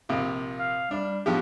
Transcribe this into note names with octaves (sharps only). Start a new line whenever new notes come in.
A#1 C3 F4
F5
G3 D4
B2 F3 D4 G4